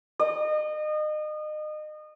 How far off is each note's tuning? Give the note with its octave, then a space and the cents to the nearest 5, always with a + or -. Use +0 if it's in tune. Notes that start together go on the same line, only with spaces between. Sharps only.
D#5 -30